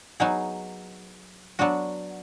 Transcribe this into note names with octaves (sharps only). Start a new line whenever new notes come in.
F#3 B3 D#4 G#4
F#3 B3 D4 F#4